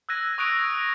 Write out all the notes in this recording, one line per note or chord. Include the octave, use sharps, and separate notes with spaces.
E6 F#6 G#6 A#6 D#7
C#6 D#6 F#6 G#6 D7 F7